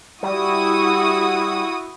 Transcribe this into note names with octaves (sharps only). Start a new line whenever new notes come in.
G3 E4 F#4 D#6